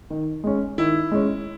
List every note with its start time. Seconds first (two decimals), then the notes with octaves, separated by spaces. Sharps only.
0.10 D#3
0.44 G#3 C#4
0.78 D#3 E4
1.12 G#3 C#4